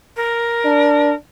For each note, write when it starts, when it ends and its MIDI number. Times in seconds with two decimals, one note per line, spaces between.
0.16 1.14 70
0.65 1.13 62